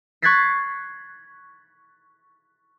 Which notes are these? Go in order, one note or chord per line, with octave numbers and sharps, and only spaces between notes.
C#6 F#6 G#6 A6 B6 C7